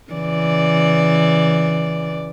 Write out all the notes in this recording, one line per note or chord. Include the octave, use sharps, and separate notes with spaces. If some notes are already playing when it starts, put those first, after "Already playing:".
C#3 E3 D5